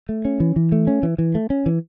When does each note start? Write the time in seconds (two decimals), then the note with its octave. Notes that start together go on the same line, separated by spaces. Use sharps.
0.09 A3
0.25 C#4
0.40 E3
0.56 E3
0.72 A3
0.87 C#4
1.03 E3
1.18 E3
1.35 A3
1.50 C#4
1.66 E3